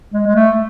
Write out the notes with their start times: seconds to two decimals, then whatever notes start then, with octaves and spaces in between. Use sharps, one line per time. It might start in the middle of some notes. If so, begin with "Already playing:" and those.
0.13 G#3
0.27 G#3
0.35 A3